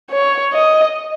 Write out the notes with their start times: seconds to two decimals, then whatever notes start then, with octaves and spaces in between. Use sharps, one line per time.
0.11 C#5
0.54 D#5